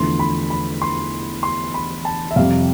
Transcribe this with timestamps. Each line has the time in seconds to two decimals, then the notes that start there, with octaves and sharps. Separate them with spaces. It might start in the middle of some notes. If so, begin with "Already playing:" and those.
Already playing: E2 D3 F3 A3 C6
0.19 B5
0.50 B5
0.82 C6
1.43 C6
1.74 B5
2.05 A5
2.31 E5
2.36 F2 C3 G3 F5